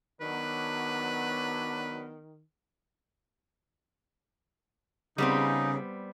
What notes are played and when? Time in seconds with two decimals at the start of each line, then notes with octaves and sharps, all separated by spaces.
0.21 D#3 F#3 B3 D4 B4
5.18 C#3 G3 B3 C4 D#4